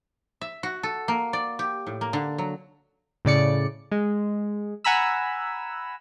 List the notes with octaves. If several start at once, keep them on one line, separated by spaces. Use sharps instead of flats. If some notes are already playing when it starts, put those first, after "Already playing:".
E5
F#4
A4
A#3
D5
G4
A2
A#3
D3
F#3
A2 C#3 D5 C#7
G#3
F#5 G#5 A#5 B5 E6